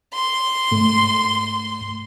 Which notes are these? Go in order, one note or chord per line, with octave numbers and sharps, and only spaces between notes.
C6
G#2 A3